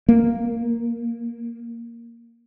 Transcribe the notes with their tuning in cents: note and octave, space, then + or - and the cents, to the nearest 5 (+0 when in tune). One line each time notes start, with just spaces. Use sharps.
A#3 +0